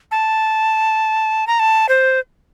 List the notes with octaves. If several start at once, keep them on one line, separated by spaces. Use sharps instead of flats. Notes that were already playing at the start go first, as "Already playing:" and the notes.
A5
A#5
A5
C5